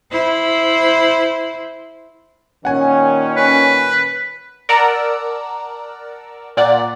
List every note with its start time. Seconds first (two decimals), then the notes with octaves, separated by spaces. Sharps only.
0.11 E4 C5
2.65 A#2 D#3 C#4 F#5 G#5
3.37 B4
4.69 A#4 D5 F#5 A5 A#5 E6
6.57 A#2 D5 F#5